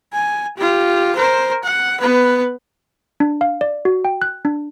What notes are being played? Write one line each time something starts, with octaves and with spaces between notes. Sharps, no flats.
G#5
F4 G4
A#4 C5
F#5
B3 B4
D4
F5
D5
F#4
G5
F#6
D4